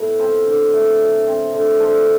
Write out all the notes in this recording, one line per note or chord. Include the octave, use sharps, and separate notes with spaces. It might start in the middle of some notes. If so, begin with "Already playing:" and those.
Already playing: A2 B3 F#5 A5
C4 A4 C5
D3
A3
F#3
C4
D3
D3 A4 C5